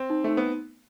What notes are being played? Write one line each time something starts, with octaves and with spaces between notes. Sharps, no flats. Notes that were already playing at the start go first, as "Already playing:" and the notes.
Already playing: C4
D#4
A3 D#4
B3